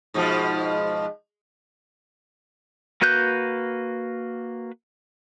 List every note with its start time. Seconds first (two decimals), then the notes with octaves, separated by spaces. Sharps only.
0.14 G#2 B2 F3
3.01 A#3 F#4 B4 F#6 G6